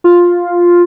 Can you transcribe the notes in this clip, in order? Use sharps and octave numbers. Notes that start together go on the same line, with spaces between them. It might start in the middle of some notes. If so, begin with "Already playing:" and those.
F4